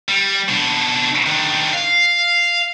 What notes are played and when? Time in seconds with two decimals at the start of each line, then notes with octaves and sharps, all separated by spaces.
0.09 G3
0.48 B2 D4
1.26 D#3 D4
1.73 F5